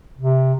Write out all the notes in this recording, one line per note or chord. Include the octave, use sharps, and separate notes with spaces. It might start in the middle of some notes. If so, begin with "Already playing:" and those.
C3